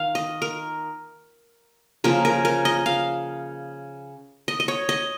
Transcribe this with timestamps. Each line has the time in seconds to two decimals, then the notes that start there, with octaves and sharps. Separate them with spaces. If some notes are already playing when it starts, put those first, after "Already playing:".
Already playing: D#3 F5
0.15 D#5
0.42 A#4
2.04 C#3 F3 A#3 A#4
2.25 A#4
2.45 A#4
2.65 D#5
2.86 F5
4.48 D#5
4.60 D#5
4.68 C#5
4.89 D#5